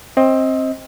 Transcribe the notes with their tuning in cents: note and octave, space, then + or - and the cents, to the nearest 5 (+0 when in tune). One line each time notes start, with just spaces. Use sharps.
C4 +20 D#5 +25